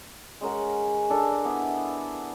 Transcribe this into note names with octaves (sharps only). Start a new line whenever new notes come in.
G#3 C#4 A#4 F#5
D4 A4 A#4 D5
B3 D4 E4